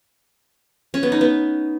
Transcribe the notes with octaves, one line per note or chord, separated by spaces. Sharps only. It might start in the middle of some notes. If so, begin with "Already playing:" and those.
C#4
B3
D#4
B3